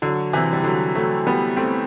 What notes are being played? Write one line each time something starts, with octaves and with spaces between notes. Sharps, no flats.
D3 F#3
C3 E3
G3
D3 F#3
F#3 A3
G3 B3
A3 C4